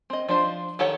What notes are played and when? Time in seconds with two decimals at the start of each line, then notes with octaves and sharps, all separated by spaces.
0.10 C4 D#5
0.28 F3 D4 F4 C5
0.79 D#3 G4 A4 C#5 F#5